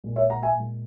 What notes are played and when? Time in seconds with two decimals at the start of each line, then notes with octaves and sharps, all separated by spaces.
0.04 A#2 G#3
0.16 C#5 E5
0.29 F#5 A#5
0.42 E5 G#5
0.55 A#2 G#3